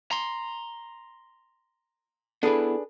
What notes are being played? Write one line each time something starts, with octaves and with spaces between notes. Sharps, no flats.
A#5 C6
B3 D4 E4 G#4 A4 B4